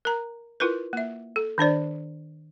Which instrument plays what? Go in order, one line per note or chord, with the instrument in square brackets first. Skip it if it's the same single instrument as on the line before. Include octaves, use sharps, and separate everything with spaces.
[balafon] A#4 A#5
E4 F4 A#4 B4
A#3 E5
A4
D#3 D4 C5 D5